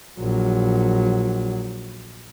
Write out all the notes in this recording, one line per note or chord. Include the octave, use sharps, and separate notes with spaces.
A#1 F#3